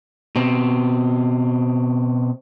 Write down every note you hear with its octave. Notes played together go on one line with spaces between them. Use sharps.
B2 C4